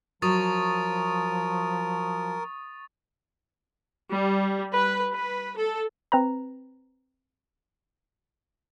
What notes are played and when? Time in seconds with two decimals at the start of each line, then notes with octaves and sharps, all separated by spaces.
0.22 F3 F#3 A#4 C#6 D#6 A6
4.12 G3
4.73 B4
5.14 B4
5.57 A4
6.12 C4 B4 A#5